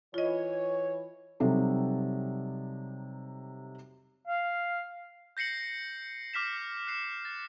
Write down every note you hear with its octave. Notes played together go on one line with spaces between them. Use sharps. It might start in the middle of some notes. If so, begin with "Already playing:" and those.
E3 F4 C#5 D#5
C3 F#3 G3 D#4 A4
F5
G6 A#6 C7 C#7 F#7
D6 F6 B6 E7
F#6 C7 E7
A6